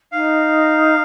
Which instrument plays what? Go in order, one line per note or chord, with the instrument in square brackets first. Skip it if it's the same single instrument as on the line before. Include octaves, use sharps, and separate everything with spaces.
[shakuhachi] D#4 [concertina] F5